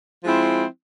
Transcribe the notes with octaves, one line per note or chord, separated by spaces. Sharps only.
F3 G#3 C4 E4